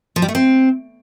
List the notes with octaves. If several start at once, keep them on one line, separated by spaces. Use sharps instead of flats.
F3
G3
A3
C4